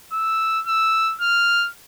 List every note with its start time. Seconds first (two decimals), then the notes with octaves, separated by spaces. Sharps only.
0.13 E6
0.67 E6
1.21 F6